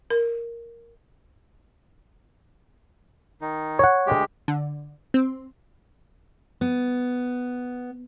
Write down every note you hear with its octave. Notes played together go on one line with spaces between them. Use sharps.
A#4
D#3 D#4
C#5 F#5
D2 G#3 G4
D3
C4
B3